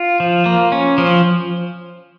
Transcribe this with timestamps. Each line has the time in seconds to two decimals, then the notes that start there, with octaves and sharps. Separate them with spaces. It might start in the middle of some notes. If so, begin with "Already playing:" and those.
Already playing: F4
0.20 F3
0.46 A#3
0.72 C#4
0.98 F3